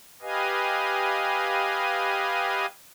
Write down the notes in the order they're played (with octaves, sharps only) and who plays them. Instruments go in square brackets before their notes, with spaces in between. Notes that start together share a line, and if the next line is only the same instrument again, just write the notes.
[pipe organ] G4 B4 D#5 F5 G#5